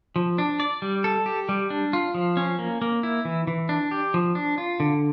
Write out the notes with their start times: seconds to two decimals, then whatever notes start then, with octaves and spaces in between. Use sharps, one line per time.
0.16 F3
0.38 D4
0.60 D5
0.82 G3
1.04 A4
1.26 G4
1.49 G3
1.70 D4
1.93 F4
2.14 F3
2.37 C#4
2.59 A#3
2.82 A#3
3.03 E4
3.25 E3
3.47 E3
3.69 D4
3.91 G4
4.14 F3
4.35 D4
4.58 F4
4.80 D3